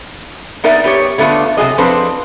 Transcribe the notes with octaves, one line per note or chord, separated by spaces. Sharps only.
B3 D#4 A#4 D5 E5
B3 G4 C#5
D3 A3 B3 D4 F4
C3 F#3 G#4 D#5
F3 C4 D4 A4 B4 C5